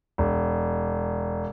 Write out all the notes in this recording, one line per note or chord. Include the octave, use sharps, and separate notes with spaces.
E1